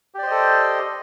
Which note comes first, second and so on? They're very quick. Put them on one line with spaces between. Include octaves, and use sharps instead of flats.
G4 D5 C5 D#5 A4